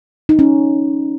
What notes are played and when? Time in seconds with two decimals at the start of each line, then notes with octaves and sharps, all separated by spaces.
0.29 D#4
0.39 C#4